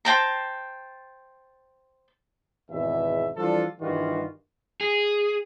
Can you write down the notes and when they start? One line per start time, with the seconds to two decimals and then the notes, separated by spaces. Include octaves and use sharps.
0.05 C5 G5 A5 A#5
2.71 G#1 E2 B2 E5
3.37 E3 F3 G3 D4 F4 A4
3.81 G2 D#3 E3 G3 F4 F#4
4.81 G#4